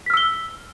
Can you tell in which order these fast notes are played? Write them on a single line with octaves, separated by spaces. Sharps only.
B6 F6 E6 G7